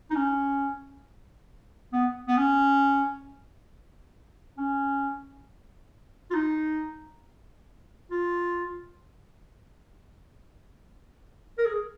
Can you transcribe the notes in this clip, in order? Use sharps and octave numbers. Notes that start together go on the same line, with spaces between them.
D#4
C#4
B3
B3
C#4
C#4
F4
D#4
F4
A#4
G#4